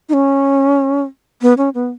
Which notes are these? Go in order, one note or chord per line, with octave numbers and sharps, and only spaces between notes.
D#4
C#4
B3
C#4
B3